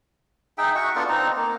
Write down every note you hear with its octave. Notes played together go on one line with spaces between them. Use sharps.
D#4 G#4 E5 G5
F#4 E5 C#6
B3 D4 F4 A4
C4 D#4 A#5
A#3